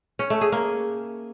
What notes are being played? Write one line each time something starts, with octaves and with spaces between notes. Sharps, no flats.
C#4
A3
G#4
A#3